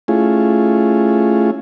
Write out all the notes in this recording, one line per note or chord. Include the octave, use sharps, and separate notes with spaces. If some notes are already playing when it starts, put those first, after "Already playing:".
A3 C#4 E4 F4 G#4